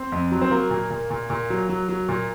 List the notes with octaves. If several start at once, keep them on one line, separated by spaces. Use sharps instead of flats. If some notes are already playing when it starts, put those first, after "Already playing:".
Already playing: C4
F2
F#3
C4
F#3 A#3
A#2
A#2
A#2
A#2
F#3
F#3
F#3
A#2